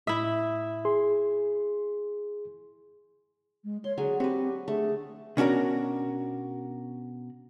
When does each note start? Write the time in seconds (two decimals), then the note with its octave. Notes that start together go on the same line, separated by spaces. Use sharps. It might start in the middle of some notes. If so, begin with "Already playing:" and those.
0.07 A2 E4 E5 D#6
0.85 G#4 C6
3.64 G#3
3.84 C#5 C6
3.98 D3 F#3 G#4 G#5
4.20 C4 F#4 G4 B4
4.68 D3 A3 G#4
5.37 B2 C#4 D4 F#4 A#4